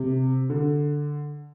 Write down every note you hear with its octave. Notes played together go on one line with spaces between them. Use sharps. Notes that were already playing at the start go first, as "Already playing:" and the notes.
Already playing: C3
D3